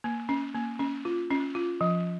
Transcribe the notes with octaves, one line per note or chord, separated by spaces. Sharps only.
A#3
C#4
A#3
C#4
F4
C#4
F4
F3